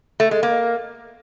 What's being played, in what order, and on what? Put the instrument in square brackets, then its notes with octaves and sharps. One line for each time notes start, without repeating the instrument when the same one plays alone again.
[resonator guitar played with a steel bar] A3
G#3
A#3